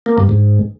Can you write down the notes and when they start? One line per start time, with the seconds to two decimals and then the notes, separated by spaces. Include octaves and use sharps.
0.06 A#3
0.18 G2
0.29 G#2